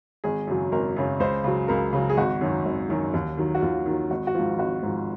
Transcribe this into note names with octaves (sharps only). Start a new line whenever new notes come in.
G#1 G#4
F#2 C#3 F#3
G#1 A#4
F#2 C#3 F#3
C#2 C5
C#3 F#3
C#2 A#4
C#3 F#3
G#4
G#1 F#4
F#2 D#3 F#3
G#1
F#2 D#3 F#3
D#2
D#3 F#3
F#4
D#2 F4
D#3
F#3
G#1 F#4
F#4
G#2 F3 F4
F4
G#1 F#4
G#2 F3